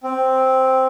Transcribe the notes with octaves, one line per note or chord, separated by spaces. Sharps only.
C4